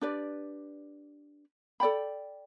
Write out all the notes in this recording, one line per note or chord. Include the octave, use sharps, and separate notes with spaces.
D4 G4 B4 D5
A4 D5 G5 B5